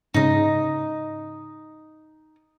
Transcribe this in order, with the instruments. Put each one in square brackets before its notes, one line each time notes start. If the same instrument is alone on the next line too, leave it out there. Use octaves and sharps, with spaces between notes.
[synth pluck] G#2 C#3 [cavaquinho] D#4 D#5